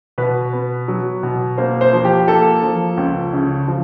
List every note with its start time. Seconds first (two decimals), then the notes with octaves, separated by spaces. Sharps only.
0.18 B2 B4
0.53 B3
0.88 F#3
1.23 B2
1.58 A#3 C5
1.81 C5
1.93 F3
2.04 G4
2.28 A#3 A4
2.63 F3
2.97 C#2
3.33 C#3
3.68 F3